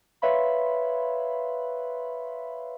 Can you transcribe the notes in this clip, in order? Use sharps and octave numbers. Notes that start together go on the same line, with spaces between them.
B4 C#5 E5 F5 B5 C6